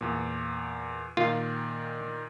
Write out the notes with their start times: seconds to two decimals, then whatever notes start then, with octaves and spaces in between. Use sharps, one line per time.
0.01 E2 A#2
1.17 A#2 D#3 F4